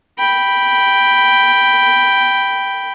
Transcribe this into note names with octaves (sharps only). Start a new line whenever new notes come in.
G5 B5